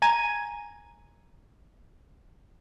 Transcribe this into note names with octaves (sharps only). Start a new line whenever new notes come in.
G#5 A#5 G#6 D#7